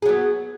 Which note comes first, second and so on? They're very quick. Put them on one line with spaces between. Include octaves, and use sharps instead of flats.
G#4 F#3 B3